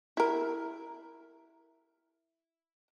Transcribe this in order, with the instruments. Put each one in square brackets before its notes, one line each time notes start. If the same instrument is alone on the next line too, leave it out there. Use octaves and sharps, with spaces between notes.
[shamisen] E4 A#4